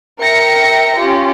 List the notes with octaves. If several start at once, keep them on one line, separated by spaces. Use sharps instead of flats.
A#4 E5 G5 A#6 C#7
C#4 F4 G4